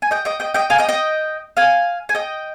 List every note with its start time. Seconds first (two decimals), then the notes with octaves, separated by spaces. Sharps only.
0.02 G#5
0.11 D#5 G5
0.25 D#5 G5
0.40 D#5 G5
0.54 D#5 G5
0.70 F5 G#5
0.78 D#5 G5
0.89 D#5 G5
1.57 F5 G#5
2.09 G#5
2.15 D#5 G5